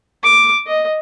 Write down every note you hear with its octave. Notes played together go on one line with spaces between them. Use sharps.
D6
D#5